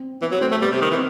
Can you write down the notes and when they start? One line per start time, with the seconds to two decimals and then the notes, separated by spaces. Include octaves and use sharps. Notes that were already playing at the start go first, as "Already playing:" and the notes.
Already playing: C4
0.21 E3 B3
0.32 F#3
0.41 A3 C4
0.51 A3
0.62 G3 B3
0.71 C3
0.81 D#3
0.91 E3
0.94 C4